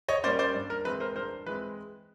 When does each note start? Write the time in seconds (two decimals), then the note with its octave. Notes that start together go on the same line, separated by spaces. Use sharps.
0.08 C#5 D#5
0.24 G3 A#3 C#4 C5 D5
0.39 C5 D5
0.55 G2
0.70 A#4
0.85 E3 G#3 C4 B4
1.00 A#4 C5
1.16 G2 A#4 C5
1.46 E3 G#3 C4 B4